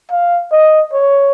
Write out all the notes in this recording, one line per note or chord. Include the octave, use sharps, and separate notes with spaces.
F5
D#5
C#5